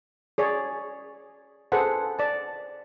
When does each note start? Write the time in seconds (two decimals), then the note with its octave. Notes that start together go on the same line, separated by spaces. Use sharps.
0.38 G#4 C#5 D5
1.72 G#4 A4 B4 C5 F#5
2.19 D5 A5